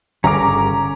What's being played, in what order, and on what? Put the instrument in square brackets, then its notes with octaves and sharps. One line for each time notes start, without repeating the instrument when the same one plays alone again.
[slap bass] G1 C#3 G3 [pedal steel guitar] C#4 D6 [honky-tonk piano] A#5